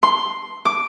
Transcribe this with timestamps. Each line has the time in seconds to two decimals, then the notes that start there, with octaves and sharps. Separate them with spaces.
0.03 C6
0.65 D6